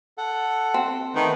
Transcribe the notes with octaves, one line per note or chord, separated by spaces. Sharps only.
A4 F#5
C4
D#3 A3 B3 B4